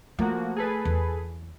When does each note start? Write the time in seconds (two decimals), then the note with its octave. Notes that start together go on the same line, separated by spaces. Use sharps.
0.19 F3 A3 A#3 F#4
0.56 G#4 A4 B4
0.85 E2